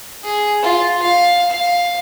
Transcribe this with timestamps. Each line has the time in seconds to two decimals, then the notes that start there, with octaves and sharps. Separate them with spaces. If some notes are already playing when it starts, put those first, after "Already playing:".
0.24 G#4
0.63 F4
1.03 F5
1.51 F5